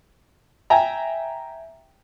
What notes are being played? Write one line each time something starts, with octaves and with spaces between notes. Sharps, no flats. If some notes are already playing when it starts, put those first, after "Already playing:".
E5 G5 G#5 A#5